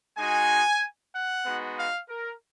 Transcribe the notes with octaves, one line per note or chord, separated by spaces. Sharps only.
G#3 D#4 F#4 G#5
F#5
G#3 B3 D#4 F#4
F5
A#4